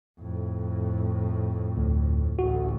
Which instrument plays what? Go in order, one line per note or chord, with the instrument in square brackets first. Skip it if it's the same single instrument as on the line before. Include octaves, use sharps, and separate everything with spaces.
[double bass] F2 A2
[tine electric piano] D2
[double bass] A1 D2 [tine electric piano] F#4